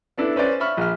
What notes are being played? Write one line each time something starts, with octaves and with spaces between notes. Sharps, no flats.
B3 D4 E4 A4
C#4 B4 C5 D5
E5 B5 C#6 F6
A#1 F6